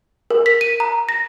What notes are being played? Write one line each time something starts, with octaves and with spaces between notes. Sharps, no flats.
A#4
B6
D#7
A#5
A#6